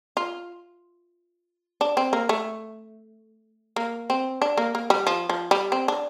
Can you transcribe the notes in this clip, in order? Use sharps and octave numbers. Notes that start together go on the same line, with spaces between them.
F4
D4
C4
A#3
A3
A#3
C4
D4
A#3
A#3
G3
F3
F3
G3
C4
D4